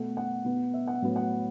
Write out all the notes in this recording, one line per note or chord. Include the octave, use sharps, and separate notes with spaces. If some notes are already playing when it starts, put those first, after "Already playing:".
Already playing: B2 A3 F#5
F#5
B2 B3
E5
F#5
A2 F#3 B3
F#5